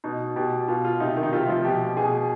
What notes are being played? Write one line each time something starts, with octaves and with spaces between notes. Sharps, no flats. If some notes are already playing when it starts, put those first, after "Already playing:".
B2 D#4
B2 G4
B2 F4
F4
C3 D#4
D#3
D#4
C3 F4
F3
B2 G4
B2 G#4